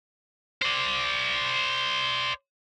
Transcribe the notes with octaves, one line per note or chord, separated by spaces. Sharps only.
C5 D5